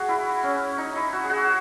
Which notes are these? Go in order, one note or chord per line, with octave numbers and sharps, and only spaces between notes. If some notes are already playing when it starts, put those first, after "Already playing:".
Already playing: F#4 G#4
E4
C#4
D#4
E4
F#4
G#4
F#4